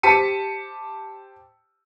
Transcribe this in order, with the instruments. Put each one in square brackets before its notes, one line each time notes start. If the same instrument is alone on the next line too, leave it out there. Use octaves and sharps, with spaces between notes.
[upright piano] G4 C5 A5 B6 C#7 D#7